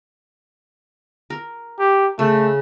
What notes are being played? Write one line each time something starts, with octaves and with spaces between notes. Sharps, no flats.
A#4
G4
C#3 A3